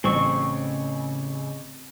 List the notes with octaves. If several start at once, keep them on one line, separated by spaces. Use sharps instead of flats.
A1 C#3 C4 C#6